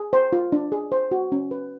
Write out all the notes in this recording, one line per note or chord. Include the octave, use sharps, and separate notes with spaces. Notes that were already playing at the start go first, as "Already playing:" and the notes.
Already playing: G#4
C5
F4
D4
G#4
C5
F#4
C#4
B4